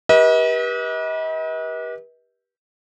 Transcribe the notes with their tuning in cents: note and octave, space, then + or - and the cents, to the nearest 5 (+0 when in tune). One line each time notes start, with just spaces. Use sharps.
G4 +0 B4 -35 D#5 +40